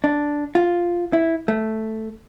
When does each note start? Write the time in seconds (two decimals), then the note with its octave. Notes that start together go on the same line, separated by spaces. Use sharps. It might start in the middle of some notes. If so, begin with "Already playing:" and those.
0.04 D4
0.55 F4
1.13 E4
1.48 A3